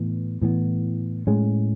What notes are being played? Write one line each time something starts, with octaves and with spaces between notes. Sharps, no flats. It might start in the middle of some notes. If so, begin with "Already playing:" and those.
Already playing: A2 E3 B3
A2 E3 B3
A2 G#3 C#4